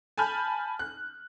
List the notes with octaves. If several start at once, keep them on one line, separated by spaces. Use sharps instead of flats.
G#5 A5 B5 F6 G6
F#6